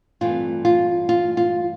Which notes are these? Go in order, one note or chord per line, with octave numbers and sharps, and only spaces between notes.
G2 E3 A3 C4 F4
F4
F4
F4